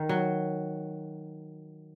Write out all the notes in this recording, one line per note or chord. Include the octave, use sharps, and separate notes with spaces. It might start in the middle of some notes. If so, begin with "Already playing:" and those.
Already playing: D#3
F#3